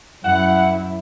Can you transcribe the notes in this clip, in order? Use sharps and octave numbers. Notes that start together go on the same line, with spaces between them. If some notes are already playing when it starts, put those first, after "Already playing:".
F#2 E4 F#5